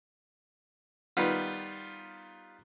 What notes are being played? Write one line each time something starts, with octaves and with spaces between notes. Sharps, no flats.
D#3 G3 B3 F4